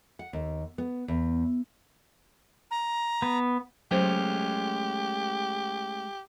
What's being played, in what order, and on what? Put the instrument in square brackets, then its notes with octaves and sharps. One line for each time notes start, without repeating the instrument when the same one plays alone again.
[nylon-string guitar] F#5
D#2
B3
E2
[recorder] A#5
[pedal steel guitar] B3
[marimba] F#3 C5 [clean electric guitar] G#3 A3 C#4 [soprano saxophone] G4